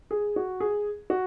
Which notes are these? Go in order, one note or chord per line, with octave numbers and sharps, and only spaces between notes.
G#4
F#4
G#4
F#4